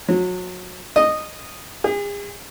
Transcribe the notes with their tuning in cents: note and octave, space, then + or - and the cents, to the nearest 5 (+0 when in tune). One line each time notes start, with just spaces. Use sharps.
F#3 -30
D#5 -10
G#4 -40